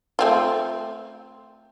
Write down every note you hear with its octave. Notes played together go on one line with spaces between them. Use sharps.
A3 C4 F4